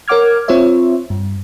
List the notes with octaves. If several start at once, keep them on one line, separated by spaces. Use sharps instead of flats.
A#4 C#5 F#5 D6 F6 G#6
C4 F4 C5 C#5 E5
G2